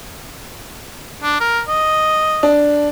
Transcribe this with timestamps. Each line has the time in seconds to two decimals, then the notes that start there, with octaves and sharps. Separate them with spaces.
1.23 D4
1.40 A#4
1.68 D#5
2.43 D4